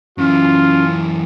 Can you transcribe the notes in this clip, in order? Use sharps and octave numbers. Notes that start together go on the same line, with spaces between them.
F#2 E3 C#4 F4